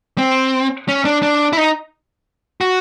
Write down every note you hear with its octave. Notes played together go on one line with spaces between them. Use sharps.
C4
C#4
D4
D4
E4
D#4
F#4